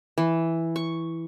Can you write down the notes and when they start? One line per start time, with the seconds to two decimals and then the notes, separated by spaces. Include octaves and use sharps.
0.18 E3
0.76 C#6